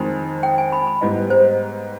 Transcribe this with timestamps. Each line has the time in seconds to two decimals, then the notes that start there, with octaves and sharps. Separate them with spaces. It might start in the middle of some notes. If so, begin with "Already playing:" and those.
Already playing: F2 D#3 G#3
0.43 G5
0.58 G#5
0.72 B5
0.87 B5
1.01 G#2 G3 B3 D#4
1.30 C5